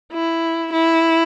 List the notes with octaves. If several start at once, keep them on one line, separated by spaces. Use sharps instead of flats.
E4
E4